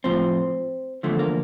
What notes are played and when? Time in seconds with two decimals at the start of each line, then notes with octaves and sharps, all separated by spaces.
0.04 A2 F3 C4
1.03 E2 D3 F3 A3
1.19 A#3